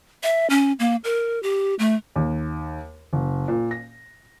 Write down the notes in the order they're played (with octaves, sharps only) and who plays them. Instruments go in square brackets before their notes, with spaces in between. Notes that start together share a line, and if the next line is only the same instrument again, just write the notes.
[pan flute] E5
C#4
A#3
A#4
G4
A3
[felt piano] D#2
F#1
A#2
A#6